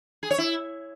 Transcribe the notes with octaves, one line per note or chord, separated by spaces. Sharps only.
G#4
C#5
E4